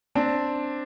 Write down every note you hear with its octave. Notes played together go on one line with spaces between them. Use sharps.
C4 D4